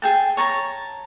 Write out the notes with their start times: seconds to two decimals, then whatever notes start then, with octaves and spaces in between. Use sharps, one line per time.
0.02 G#4 G5 A5
0.37 C#5 A5 A#5